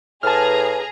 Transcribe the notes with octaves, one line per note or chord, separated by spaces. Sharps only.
A2 G#4 B4 A5 A#5 F6